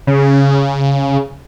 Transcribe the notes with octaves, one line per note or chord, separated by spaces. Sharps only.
C#3